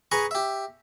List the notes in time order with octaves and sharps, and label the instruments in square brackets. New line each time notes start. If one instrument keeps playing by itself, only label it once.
[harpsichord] G#4 B4 G#5 A#5 B5 C#6
G4 E5